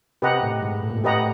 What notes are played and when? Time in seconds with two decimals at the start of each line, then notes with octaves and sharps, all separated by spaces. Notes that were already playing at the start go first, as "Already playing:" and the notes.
0.22 C3 G4 B4 D#5 F#5 A#5
0.43 A2
0.62 G#2
0.83 A2
0.90 A#2
0.98 A2
1.04 G4 B4 D#5 F#5 A#5